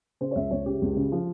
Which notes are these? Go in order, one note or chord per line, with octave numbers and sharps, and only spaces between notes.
C#3 C5
C#5
C#2 E5
C#2 C#5
C#3 G4
C#2
C#3
F3 F4